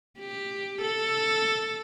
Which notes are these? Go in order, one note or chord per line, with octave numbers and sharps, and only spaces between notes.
G4
A4